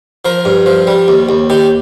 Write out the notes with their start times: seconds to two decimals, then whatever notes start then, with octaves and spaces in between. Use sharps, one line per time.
0.25 F3 A#4
0.45 G2
0.66 F3
0.87 G3
1.08 D#2
1.29 D#2
1.50 D#3 G4